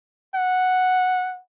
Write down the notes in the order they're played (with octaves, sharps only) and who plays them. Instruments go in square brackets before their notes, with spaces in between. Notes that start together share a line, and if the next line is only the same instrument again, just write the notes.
[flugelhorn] F#5